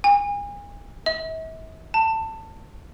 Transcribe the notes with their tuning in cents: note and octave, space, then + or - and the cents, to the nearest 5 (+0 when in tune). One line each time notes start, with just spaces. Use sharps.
G#5 -35
E5 -40
A5 +20